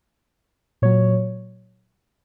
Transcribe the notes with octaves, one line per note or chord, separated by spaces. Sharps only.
A#2 F#3 C#5